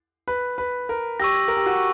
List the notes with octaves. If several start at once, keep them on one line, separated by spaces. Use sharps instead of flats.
B4
B4
A#4
G4 C#6 E6 A#6
A#4
G4
F#4